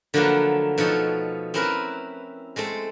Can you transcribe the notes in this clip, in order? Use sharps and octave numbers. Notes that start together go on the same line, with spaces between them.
D3 F3 F#3 A3 A#3 B4
B2 F3 D#4 A4 C#5
C4 C#4 E4 A#4 B4
G#3 A3 C4 A4